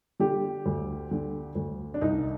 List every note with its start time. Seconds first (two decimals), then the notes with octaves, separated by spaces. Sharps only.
0.20 D3 G4
0.66 D2
1.11 D3
1.55 D2
1.94 D4
2.01 C2 D#4